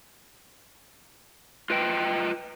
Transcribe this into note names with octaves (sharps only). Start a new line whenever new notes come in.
F4 B4 D#5 G5